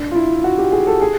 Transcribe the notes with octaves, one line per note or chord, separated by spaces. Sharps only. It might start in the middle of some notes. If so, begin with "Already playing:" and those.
Already playing: D4
F4
E4
F#4
G4
G#4
A4
G#4